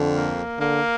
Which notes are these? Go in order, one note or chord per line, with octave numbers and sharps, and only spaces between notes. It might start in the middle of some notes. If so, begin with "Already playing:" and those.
Already playing: F2 D3
A#3
D3 A#3